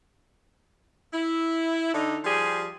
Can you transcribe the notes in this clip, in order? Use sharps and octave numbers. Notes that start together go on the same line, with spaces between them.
E4
D3 D#4
F3 G3 G4 G#4